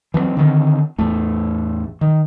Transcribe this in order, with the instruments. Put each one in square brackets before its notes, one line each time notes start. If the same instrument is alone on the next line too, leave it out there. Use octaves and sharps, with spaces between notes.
[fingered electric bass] E3 F#3 G#3 C4
D3 D#3 C4
A1 E2 A2 A3
D#3